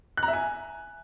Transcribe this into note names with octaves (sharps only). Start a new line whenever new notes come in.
F#6
A#5
E5
G#5